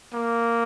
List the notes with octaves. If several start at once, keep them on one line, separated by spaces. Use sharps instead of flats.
A#3